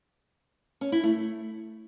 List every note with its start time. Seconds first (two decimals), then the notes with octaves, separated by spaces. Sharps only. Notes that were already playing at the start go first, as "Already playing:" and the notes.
0.81 C#4
0.92 E4
1.03 A3